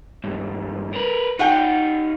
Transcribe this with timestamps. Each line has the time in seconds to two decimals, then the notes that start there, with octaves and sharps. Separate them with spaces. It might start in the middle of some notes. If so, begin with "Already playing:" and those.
0.24 C#2 G2
0.93 A#4 B4
1.39 D#4 F4 F#4 F#5 G5